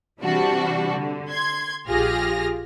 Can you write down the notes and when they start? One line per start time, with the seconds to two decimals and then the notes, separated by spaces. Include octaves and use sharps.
0.21 C3 E3 G3 D4 F#4
0.96 D3
1.29 C6 G#6
1.87 A#1 F4 G4 G#4 F6 A#6